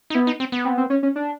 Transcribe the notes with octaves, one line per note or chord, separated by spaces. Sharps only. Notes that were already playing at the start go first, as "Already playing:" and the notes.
D#4
B3 E4
D#4
C4
B3
C4
C4
C#4
C#4
D4